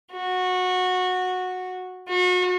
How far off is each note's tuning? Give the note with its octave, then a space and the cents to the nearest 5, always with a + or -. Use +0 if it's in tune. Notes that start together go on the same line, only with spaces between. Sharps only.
F#4 -15
F#4 -35